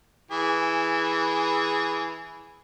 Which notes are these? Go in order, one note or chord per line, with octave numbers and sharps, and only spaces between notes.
E3 G#4